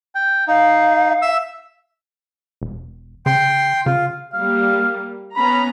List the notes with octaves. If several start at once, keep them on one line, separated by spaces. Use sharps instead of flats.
G5
D#4 F5
E5 E6
E1
C#3 G5 C6
C#3 F4
G3 A#3 F5
B3 C#4 A#5 B5